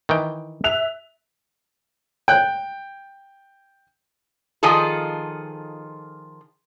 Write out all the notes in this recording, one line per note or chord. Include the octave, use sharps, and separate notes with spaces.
D#3 E3 G5
E5 F#6 F7
G5 F#6
D#3 F3 F4 G#4 A4